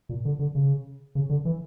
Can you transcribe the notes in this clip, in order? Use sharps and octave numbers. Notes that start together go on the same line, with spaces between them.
A#2
D3
D3
C#3
C#3
D3
E3